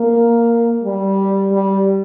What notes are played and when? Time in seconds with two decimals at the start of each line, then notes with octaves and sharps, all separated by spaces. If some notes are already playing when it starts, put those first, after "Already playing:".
Already playing: A#3
0.84 G3
1.52 G3